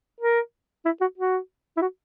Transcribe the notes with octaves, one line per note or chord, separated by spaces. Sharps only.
A#4
E4
F#4
F#4
E4
F#4